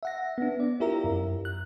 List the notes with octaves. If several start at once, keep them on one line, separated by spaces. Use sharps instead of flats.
E5 F#5 A#6
B3 D4
D5
E4 F4 G4 A#4 E5 A#5
F#2
F#6